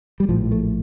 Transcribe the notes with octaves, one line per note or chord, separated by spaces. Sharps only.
G3
A#1 A2 F3
A3